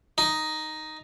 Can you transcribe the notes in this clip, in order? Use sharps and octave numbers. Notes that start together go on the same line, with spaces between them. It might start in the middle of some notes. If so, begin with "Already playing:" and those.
D#4